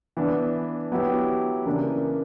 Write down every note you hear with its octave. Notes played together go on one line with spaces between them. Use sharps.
E3 B3 D4
F#3 B3 E4 G4
C#3 E3 A#3 D4